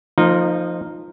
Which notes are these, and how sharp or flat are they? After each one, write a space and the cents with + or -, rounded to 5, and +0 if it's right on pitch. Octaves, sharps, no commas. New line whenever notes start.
F3 +0 A#3 -40 D#4 -15